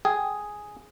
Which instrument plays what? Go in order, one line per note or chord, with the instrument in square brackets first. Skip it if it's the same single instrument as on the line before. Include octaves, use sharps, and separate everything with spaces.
[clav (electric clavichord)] G#4 [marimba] G5